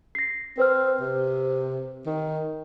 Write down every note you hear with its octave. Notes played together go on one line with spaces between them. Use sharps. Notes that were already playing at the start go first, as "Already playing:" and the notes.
A#6 C7
C4 B4 C5 F6
C3
D#3